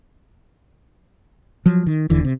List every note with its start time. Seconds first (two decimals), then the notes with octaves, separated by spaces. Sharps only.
1.66 F3 F#3
1.87 D#3
2.10 E1 D#2 D3 E3
2.25 C3